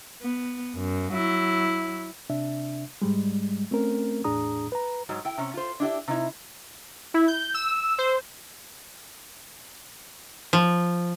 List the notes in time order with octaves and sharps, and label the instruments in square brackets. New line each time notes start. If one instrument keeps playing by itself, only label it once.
[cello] B3
F#2
F#3 E4
[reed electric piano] C3 D4 E5
G#2 G3 G#3
A3 C4 C#4 A#4
E2 A2 D4 G#4 A#5 D#6
B4 A#5
[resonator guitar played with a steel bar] G#2 F#3
E4 G5
C3 C#4
F4 C5
D4 E4 G4 E5
C3 D#4 E4
[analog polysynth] E4
G6
E6
C5
[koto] F3